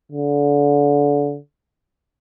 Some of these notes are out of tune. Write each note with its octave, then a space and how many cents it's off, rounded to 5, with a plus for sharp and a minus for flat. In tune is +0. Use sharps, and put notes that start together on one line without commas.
D3 -30